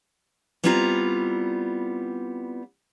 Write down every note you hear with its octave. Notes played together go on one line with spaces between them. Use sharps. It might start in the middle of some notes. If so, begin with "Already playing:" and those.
G3 B3 C4 E4 F4 A#5